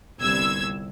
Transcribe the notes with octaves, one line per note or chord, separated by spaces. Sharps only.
G1 C2 E6 G#6